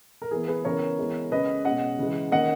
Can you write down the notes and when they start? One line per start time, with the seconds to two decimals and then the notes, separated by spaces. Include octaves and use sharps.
0.22 A#4
0.31 E3 B3 G#4
0.48 G#4 B4
0.65 C#3 E3 B3 A#4 C#5
0.98 E3 G#3 B3
1.31 C#3 G#3 C#4 B4 D#5
1.65 B2 G#3 C#4 D#5 F#5
1.99 C#3 E3 G#3
2.32 D#3 A#3 C#4 D#5 F#5